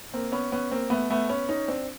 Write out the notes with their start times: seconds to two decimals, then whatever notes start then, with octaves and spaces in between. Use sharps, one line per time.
0.13 A#3 C4
0.32 B3 C#4
0.52 B3 C#4
0.71 A#3 C4
0.90 A3 B3
1.10 A3 B3
1.29 B3 C#4
1.49 C#4 D#4
1.68 C4 D4